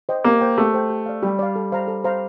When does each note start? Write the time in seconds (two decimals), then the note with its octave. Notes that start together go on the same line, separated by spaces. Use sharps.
0.09 C5 D#5 G5
0.24 A#3 G4
0.41 C5 G5
0.58 A3 G4
0.74 C5 G5
0.90 G4
1.06 D5 F5
1.23 G3 G4
1.39 D5 F5
1.56 A4
1.72 C5 F5 A#5
1.88 A4
2.04 C5 F5 A#5